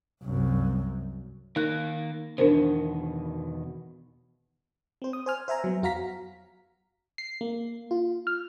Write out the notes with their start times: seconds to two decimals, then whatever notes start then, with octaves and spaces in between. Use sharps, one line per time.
0.23 C2 F#2
1.56 D#3 A#3 D#4 F#6
2.38 E2 B2 D#3 D4 A#4 C5
5.02 C4 C5
5.13 D#6
5.26 C5 G#5 F6
5.48 C5 E5 G#5 A#5
5.64 F#3 B3
5.82 F2 F#4 F5 A#5 B6
7.18 C7
7.41 A#3
7.91 F4
8.27 F6